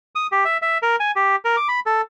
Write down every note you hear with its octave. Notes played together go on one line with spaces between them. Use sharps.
D#6
G4
E5
E5
A#4
G#5
G4
A#4
D6
B5
A4